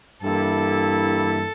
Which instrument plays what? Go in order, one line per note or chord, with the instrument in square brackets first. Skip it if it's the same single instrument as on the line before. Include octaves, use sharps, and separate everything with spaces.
[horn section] G2 E3 A#3 E4 [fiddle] A4